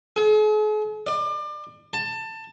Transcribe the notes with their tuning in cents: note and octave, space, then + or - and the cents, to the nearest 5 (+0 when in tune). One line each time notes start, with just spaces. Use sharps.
G#4 +45
D5 +30
A5 +20